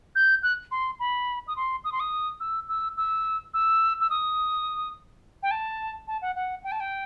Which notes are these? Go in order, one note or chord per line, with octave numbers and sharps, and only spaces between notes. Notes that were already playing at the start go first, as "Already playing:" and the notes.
G6
F#6
C6
B5
D#6
C6
D#6
C6
D#6
E6
E6
E6
E6
E6
D#6
G5
A5
A5
F#5
F#5
G5
A5
G5